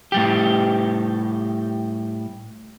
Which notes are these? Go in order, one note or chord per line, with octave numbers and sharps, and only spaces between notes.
A2 G3 G4